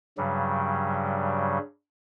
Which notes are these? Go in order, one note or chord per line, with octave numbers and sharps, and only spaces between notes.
G2 C#3 F#3 G3